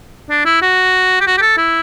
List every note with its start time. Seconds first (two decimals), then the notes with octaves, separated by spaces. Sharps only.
0.30 D4
0.45 E4
0.62 F#4
1.21 G4
1.27 F#4
1.38 G4
1.42 A4
1.58 E4